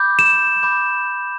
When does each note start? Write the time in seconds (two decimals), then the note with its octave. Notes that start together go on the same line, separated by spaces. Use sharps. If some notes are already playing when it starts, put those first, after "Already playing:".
Already playing: B5 D6 G6
0.19 E7
0.63 B5 D6 G6